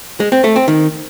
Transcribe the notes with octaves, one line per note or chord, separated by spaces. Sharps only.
G#3
C4
A3
C4
D#3